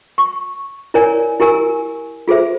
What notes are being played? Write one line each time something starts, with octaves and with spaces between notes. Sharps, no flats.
C#6
E4 A#4 C#5 D5 G#5
E4 G4 A#4 G#5 E6
F4 G#4 A4 C5 E5